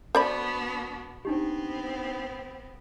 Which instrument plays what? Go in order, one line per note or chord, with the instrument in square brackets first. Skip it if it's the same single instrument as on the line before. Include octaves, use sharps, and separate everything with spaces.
[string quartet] B3 D4 F#4 [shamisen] C5 D5 B5
[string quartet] B3 C4 [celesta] D4 D#4 G4